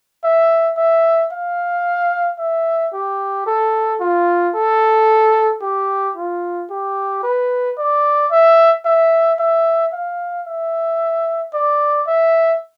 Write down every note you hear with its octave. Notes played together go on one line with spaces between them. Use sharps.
E5
E5
F5
E5
G4
A4
F4
A4
G4
F4
G4
B4
D5
E5
E5
E5
F5
E5
D5
E5